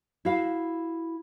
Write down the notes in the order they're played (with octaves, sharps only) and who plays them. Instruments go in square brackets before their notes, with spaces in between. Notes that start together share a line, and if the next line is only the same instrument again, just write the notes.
[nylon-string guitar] E4 F#4 F5